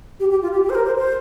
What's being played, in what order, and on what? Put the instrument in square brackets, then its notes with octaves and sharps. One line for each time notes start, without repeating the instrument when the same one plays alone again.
[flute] G4
G4
F4
G4
G4
C5
A#4
C5
C5